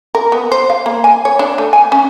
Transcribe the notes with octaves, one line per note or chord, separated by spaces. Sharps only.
A#4
B3
C5
F5
A#3
G#5
C#5
D4
A3
G#5
C#4